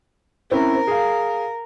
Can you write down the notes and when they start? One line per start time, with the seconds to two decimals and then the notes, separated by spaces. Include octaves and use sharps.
0.51 C4 C#4 E4 A#4
0.87 G#4 F5